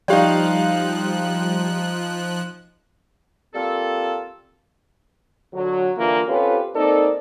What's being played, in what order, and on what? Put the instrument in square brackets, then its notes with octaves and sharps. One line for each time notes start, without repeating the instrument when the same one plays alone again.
[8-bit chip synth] F3 F#6 [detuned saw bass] G3 [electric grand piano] D#4 F5 G5 [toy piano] G4 D5
[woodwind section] G3 A#3 C4 F4 A4
[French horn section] D3 F#3
G2 D3 E3 A#3 F4
C4 C#4 F4 G4 A4 B4
A#3 C4 D#4 A4 D5